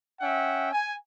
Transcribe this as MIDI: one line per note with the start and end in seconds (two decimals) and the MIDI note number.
0.21 0.68 61
0.21 0.68 76
0.21 0.68 78
0.21 0.68 79
0.72 0.93 80